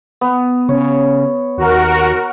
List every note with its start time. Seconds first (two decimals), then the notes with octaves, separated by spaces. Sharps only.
0.21 B3
0.69 C#3 C#5
1.58 D#2 F#4 A#4